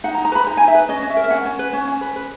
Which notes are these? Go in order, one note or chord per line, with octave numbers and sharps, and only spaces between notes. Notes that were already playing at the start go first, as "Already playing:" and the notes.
D#4 F#5
A#5
D#4
A#5
B4 B5
D#4 A#5
D#4 G#5
E5
B4
C#4 D#5
C#4
E5
A#4
E5
C#4 F#5
C#4
B4
C#4
C#4
B4
B4